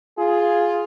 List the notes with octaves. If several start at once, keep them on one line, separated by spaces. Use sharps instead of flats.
F4 G#4